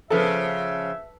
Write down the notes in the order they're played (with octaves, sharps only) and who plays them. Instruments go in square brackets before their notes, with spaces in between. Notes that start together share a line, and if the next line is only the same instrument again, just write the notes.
[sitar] C#3 F3 [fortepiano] A4 B4 [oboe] E5